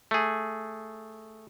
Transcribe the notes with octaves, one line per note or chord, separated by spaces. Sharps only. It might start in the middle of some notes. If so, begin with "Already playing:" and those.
A3 G#4